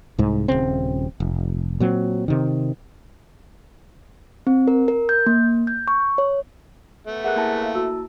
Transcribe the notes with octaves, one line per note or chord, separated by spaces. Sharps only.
C2 G#2
D#1 C2 C#3 C4
F1
A#2 F#3 C4
C3 D#3
C4
A#4
A#4
G6
A#3
G6
C#6
C#5
A3 B3
G#4 A#4 E5 F#5 F#6
A#3 E4 A5
E5 F5
F#4 E6